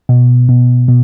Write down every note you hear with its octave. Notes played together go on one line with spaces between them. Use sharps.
B2
B2
B2